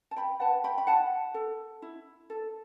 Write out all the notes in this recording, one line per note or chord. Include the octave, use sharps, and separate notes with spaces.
A5
G5 B5
B4 F#5 A5
G5 B5
B5
E4 F#5 A5
A4
E4
A4